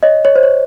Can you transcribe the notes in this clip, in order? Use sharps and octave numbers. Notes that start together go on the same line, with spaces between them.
C#5 D#5
C#5
C5
C#5